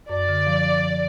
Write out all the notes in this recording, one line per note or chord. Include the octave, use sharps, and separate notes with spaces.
F#2 D5
D3
F3